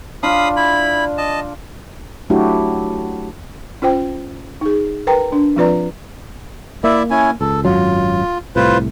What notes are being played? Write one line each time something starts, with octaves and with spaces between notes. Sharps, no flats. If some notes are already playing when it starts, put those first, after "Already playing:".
D4 F4 F5 B5 D#6
E4 B5
D#5 A5
F#3 A3 D4 E4 F#4 G4
C#4 F4 C5 G5
D#4 G#4
A#4 B4 G5 A#5
D4
F3 C4 F4 B4 D5 A#5
A#3 E4 D5 E5
C#4 E4 G#5
C#2 A4
G#1 F#2 F#3 F4
C2 A2 F4 B4 C5